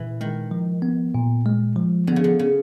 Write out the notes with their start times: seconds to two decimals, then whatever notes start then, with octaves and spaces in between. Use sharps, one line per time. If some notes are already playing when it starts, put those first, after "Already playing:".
Already playing: A#2 E3
0.21 D#3 G#3
0.51 F3
0.82 B3
1.14 A#2
1.46 G#3
1.76 F3
2.07 D3 B3
2.16 C#3
2.24 D3
2.39 C#3